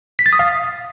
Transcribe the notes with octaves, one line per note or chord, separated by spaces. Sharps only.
B6
A6
D#6
F5